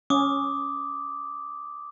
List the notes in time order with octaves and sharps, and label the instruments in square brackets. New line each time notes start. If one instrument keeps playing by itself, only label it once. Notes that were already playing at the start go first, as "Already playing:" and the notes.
[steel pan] C#4 [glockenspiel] D6 D#6